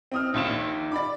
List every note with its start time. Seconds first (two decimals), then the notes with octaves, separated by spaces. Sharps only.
0.12 C4 D#6 F6
0.34 A#1 D#4 F5 E7
0.92 D5 B5 D6